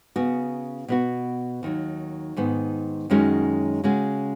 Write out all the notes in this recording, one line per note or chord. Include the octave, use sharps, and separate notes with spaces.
C#3 B3 F#4
B2 B3 F#4
D#2 D#3 F#3
G#2 D#3 B3
F#2 D#3 G#3 C#4 F#4
C#3 G#3 C#4 F#4